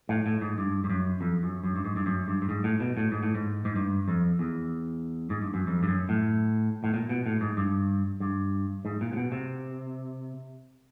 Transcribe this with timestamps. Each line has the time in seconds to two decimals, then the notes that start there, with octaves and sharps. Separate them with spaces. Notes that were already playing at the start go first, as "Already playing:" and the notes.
0.09 A2
0.26 A2
0.42 G#2
0.58 G2
0.84 G2
0.90 F#2
1.21 F2
1.43 F#2
1.64 F#2
1.76 G2
1.85 G#2
1.96 G2
2.06 F#2
2.28 G2
2.42 G2
2.49 G#2
2.64 A2
2.80 B2
2.97 A2
3.12 G#2
3.23 A2
3.35 G#2
3.65 G#2
3.76 G2
4.08 F2
4.39 E2
5.30 G#2
5.42 G2
5.54 F#2
5.67 F2
5.83 G2
5.88 F#2
6.09 A2
6.84 A2
6.94 A#2
7.09 B2
7.26 A2
7.41 G#2
7.57 G2
8.20 G2
8.85 G#2
9.01 A#2
9.13 C3
9.16 B2
9.32 C3